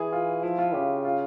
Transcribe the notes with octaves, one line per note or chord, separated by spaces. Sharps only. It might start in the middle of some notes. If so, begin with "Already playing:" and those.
Already playing: E3 G#4
F4
F3 E4
F4
C#3 G4
F4